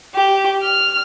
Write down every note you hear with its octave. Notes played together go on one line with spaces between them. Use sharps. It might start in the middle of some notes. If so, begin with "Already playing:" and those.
G4
F6